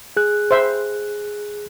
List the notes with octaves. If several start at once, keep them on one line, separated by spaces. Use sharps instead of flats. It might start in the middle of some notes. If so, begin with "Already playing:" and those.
G#4 F#6
C5 E5